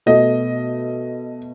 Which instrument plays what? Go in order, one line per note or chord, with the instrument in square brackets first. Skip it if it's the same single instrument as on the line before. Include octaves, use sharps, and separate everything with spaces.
[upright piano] B2 A3 D#5